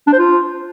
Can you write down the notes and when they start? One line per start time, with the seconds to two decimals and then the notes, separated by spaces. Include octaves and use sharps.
0.07 D4
0.13 C5
0.19 F4